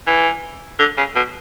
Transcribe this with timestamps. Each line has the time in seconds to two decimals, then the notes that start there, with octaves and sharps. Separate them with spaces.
0.07 E3
0.79 D3
0.97 C#3
1.15 B2